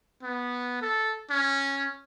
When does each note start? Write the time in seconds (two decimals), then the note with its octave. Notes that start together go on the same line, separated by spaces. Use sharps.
0.23 B3
0.82 A4
1.30 C#4